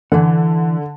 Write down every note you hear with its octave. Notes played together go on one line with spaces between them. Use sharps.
D3 E3 F#5